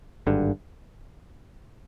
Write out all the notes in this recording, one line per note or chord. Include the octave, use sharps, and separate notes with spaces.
G#1 G2 D3